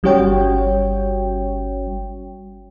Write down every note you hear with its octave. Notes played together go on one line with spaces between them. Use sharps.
G1 G3 C#4 F#4 C#5 G5